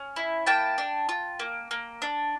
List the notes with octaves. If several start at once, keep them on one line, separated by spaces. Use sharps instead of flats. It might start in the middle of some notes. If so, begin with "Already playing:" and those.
Already playing: C#4
E4
A#3 G5 A5
D4
F4
A#3
A#3
D4